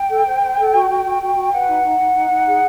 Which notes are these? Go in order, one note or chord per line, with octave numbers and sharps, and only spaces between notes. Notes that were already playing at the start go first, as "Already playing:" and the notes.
Already playing: G5
A4
C5
C5
A4
F#4
F#4
F#4
F#4
F#4
B4 F#5
D#4
D#4
D#4
D#4
D#4
G#4